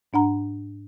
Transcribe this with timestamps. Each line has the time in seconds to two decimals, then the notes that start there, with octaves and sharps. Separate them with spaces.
0.13 G#2 D4 F#5 A#5